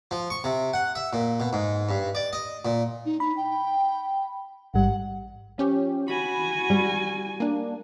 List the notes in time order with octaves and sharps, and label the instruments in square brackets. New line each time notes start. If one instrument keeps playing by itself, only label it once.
[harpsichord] F3
C#6
C3
F#5
E5
A#2
B2
G#2
G2
D5
D#5
A#2
[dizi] D#4
[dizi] D#4 [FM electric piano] B5
[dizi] G5
[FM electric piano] A1 G#2 G3 [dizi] F#5
[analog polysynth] F3 C#4 G4
[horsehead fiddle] F#4 G#5 [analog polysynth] B5
[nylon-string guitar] G3
[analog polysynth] A#3 D4